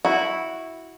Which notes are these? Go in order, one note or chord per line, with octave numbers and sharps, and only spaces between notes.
E4 F#4